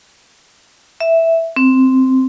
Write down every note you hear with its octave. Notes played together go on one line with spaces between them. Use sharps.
E5
C4